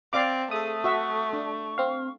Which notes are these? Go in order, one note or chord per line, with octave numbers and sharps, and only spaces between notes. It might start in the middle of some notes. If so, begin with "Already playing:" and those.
C4 D5 F5 D6
A3 G#4 A4 D#6
F#4 E5 C#6
D4 C#6
C4 F5